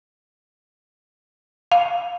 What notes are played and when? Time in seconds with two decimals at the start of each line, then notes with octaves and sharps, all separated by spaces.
1.72 F5